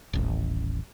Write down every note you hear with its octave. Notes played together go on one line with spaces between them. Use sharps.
D#1 A1